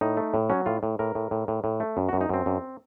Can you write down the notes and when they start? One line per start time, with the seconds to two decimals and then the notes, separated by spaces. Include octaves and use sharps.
0.01 A2 D#4
0.17 A3
0.34 A2
0.50 F#3 C#4
0.66 A2 F4
0.83 A2
0.99 A2 A#4
1.15 A2
1.31 A2
1.48 A2
1.64 A2
1.80 A3
1.97 F#2
2.09 F#4
2.13 F#2
2.21 D#4
2.29 F#2 C4
2.46 F#2